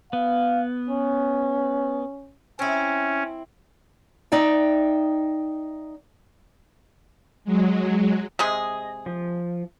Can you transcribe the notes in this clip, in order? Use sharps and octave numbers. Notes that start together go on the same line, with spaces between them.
B3 F5
C#4
C4 C#4 E4
D#4 D5 E5 G5
F#3 G#3
C3 G#3 G#4 D#5
F3